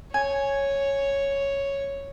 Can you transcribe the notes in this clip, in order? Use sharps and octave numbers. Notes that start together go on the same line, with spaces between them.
C#5 G#5